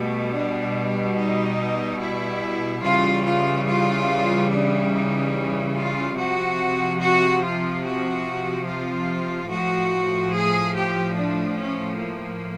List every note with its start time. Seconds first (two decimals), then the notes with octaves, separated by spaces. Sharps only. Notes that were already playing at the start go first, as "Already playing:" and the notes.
Already playing: B2 G3 A3
0.34 D4
1.17 D#4
2.01 E4
2.83 C#3 E3 G3 F4
3.25 F4
3.66 F4
4.50 D4
4.91 D#4
5.74 F4
6.16 C3 F3 F#4
6.98 F#4
7.41 F4
7.83 F#4
8.65 F4
9.48 A2 F3 F#4
10.32 G#4
10.73 G4
11.14 D4
11.56 C#4
11.98 A#3